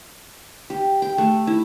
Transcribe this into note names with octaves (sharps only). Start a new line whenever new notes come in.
G4
G5
A3
E4